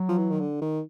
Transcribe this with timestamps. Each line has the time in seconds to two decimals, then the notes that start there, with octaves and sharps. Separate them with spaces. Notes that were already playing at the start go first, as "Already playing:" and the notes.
Already playing: F#3
0.08 F3
0.18 E3
0.30 D#3
0.40 D3
0.61 D#3